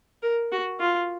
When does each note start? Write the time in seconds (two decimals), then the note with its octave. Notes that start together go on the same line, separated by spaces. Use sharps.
0.22 A#4
0.52 F#4
0.80 F4